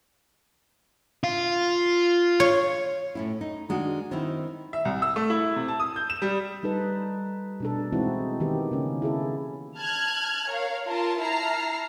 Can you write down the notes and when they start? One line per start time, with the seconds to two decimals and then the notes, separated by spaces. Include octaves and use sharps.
1.24 F4
2.40 C#5
3.15 A2 C#4 E4
3.41 D#4
3.69 D#3 G#3 D4 F#4 G#4
4.11 D#3 C4 D#4 E4
4.73 E5
4.85 C2
5.02 E6
5.16 A3
5.30 E4
5.56 C3
5.68 A5
5.80 D#6
5.96 G6
6.10 E7
6.22 G3
6.63 G3 D#4 A4 B4
7.60 B2 D4 A4
7.92 E3 G#3 C4 D#4 E4 F#4
8.40 D#3 E3 B3 G4
8.71 C#3 A#3 C#4
9.02 E4 G#4 A4
9.79 A5 F6 F#6 G#6
10.49 A#4 C#5 F5
10.87 F4 A#4 A5
11.20 E4 A5 A#5 F6 C7